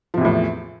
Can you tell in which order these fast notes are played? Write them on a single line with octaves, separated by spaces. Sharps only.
F3 C3 E2 A2